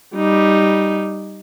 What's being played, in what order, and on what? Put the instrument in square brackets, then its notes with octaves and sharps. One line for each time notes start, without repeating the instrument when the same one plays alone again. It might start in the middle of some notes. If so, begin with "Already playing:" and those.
[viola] G3 D#4